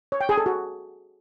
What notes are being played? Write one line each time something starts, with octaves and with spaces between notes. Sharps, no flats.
C#5
G5
G#4
A4
F#4